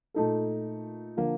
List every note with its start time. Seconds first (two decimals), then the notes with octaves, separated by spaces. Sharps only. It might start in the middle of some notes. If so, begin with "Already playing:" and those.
0.14 A#2 A3 D#4 A4
1.17 D3 F3 A#3